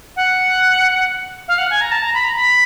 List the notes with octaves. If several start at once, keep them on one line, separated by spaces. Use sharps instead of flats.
F#5
F5
F#5
G#5
A#5
A5
A#5
B5
A#5
B5